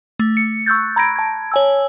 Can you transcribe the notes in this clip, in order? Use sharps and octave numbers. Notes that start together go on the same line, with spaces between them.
A3
C#7
C#6 E6 F#6 G6 A6
A#5 B5 G#6 A#6 D7
A5 G#6
C#5 G#5 E6